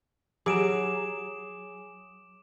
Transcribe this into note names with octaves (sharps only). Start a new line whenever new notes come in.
F#3 G4 G#4 D6 D7 E7